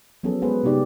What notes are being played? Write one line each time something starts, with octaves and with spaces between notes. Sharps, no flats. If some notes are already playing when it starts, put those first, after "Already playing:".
F3 F#3 B3 C#4 G#4 A4
G#3 B3 G#4 B4 C5
C3 B3 D#4 G4 D5